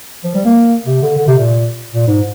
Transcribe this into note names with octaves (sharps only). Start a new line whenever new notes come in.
F3
G3
A#3
C3
D3
D3
C3
A#2
A#2
G#2